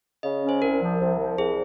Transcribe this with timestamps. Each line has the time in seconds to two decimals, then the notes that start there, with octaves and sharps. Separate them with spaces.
0.23 C#3 D#5
0.42 C#4
0.49 C5
0.62 C2 A#4
0.81 F3
1.00 C2
1.19 F3
1.38 C2 G#4